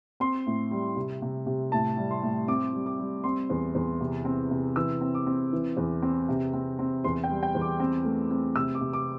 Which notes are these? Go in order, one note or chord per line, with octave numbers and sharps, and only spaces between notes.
C4 C6
A2
G3
C3
C3
C3
A2 A5
G3
C6
A2
C4 D6
G3
D6
G3
C4 C6
E2
E2
C3
C4
C3
E3 E6
C4
D6
C4
E3
E2
C4
C3
C4
C4
E2 C6
G5
G3
G5
E2
D6
C4
A3
C4
C3 E6
D6
C3
D6